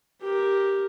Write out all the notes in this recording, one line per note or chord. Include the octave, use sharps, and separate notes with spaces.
G4 A#4